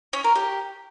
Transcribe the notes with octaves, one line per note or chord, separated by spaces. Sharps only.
C#4
A#4
G4